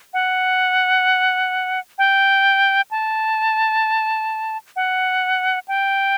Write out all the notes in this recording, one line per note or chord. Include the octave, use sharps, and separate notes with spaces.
F#5
G5
A5
F#5
G5